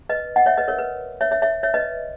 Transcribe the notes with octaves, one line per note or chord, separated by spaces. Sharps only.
B4 D#5
D#5 F#5
C#5 E5
B4 D#5
A#4 C#5
B4
C#5 E5
C#5 E5
C#5 E5
C#5 E5
B4 D#5